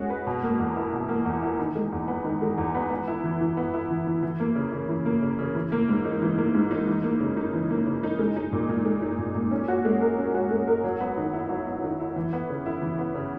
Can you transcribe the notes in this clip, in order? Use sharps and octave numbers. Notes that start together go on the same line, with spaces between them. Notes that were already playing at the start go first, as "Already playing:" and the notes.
Already playing: G#3 C#4 F#4
B4
B2
A#3
E2
E4
B2
A#3
E2
E4
D#3
G#3
E2
B3
D#3
G#3
E2
B3
B3
E4
E3
E3
B3
E4
E3
E3
E3
A#3
C#3
C#3
E3
A#3
C#3
C#3
E3
A#3
G#2
D#4
E3
A#3
G#2
D#4
E3
A#3
C#3
D#4
E3
A#3
C#3
D#4
G#3
D#4
A#2
A#2
G#3
D#4
A#2
A#2
C#4
F#4
G#3
A#4
C#4
F#4
G#3
A#4
F#3
B3
D#3
E4
F#3
B3
D#3
E4
E3
B3
C#3
E4
E3
B3
C#3